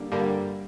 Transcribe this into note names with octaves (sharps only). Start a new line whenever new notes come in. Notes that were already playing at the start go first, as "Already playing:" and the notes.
Already playing: D3 G3 A#3
G2 D3 G3 A#3